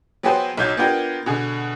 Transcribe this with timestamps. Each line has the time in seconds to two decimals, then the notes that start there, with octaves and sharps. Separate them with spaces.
0.23 F#3 B3 G4 G#4 B4 C5
0.58 B1 F#3 D#4 G6 G#6
0.77 B3 D4 F4 G4 A#4
1.26 B2 D3 G#4